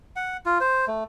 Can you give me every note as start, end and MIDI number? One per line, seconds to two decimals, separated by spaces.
0.16 0.37 78
0.46 0.58 65
0.61 0.86 72
0.88 1.04 57